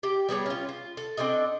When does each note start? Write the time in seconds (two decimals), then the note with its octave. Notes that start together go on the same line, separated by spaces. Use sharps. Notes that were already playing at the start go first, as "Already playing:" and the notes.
0.03 G4 G5
0.29 G3 B3 G#4 C#5
0.46 C#4 F4
0.69 F4
0.97 A4
1.17 C4 D4 A4 D#5